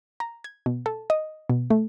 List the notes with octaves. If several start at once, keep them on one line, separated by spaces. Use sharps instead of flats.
A#5
G#6
B2
A4
D#5
B2
A3